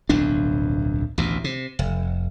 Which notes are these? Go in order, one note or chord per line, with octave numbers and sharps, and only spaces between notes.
D1 B1 F2 D4
A1 D2 B2
C3
F1